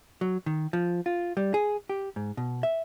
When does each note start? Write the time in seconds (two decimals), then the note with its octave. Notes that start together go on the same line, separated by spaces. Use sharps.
0.21 F#3
0.46 D#3
0.73 F3
1.06 F4
1.37 G3
1.54 G#4
1.90 G4
2.16 G#2
2.37 B2
2.63 E5